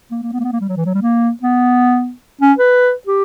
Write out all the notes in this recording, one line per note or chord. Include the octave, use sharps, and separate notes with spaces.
A#3
A#3
B3
A#3
B3
A#3
G3
F#3
E3
F#3
G3
A#3
B3
C#4
B4
G4